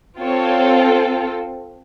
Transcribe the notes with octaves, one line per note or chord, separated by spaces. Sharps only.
C4 F4 A4 C#5